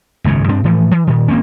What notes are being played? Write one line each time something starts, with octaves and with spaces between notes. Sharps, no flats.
G#1 C#2 F#2 C#3
G2 C4 D4
A2 E3 F3 A3
E3
A#2 D#3
G#1 A#3 C4 C#4